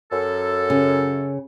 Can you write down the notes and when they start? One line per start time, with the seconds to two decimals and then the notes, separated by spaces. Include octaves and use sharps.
0.12 F#2 A4
0.70 C#3